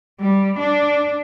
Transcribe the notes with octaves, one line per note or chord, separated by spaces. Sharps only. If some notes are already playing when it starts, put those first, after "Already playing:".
G3
D4